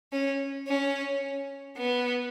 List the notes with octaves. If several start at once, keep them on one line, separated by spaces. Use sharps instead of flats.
C#4
C#4
B3